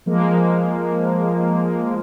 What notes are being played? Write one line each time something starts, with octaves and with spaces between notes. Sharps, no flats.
F3 G#3 A#3